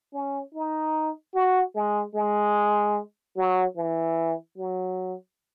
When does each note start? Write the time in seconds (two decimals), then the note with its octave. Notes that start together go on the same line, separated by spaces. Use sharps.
0.13 C#4
0.54 D#4
1.34 F#4
1.76 G#3
2.15 G#3
3.37 F#3
3.77 E3
4.57 F#3